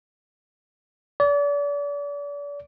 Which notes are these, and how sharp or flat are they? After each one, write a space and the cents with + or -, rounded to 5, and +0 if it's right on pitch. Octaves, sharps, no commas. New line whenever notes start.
D5 -35